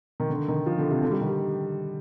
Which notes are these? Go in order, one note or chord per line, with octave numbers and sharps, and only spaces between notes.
D#3
D3
D#3
F3
D3
C3
D3
G3
D#3